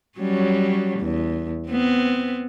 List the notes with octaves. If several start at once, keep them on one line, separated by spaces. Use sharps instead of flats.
F#3 G3 C#4
E2
B3 C4